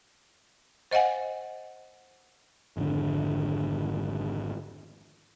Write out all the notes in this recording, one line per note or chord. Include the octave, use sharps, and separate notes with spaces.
C5 D#5 F5 F#5 G#5
G#1 F2 D3